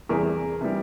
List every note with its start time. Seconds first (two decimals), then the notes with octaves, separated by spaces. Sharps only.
0.09 E2 C3 E3 G3 G#4 A#4
0.61 C3 E3 G3